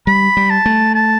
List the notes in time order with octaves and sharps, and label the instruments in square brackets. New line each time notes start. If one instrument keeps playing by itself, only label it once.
[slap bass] G3 [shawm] B5
[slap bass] G3
[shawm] A5
[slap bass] A3
[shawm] A5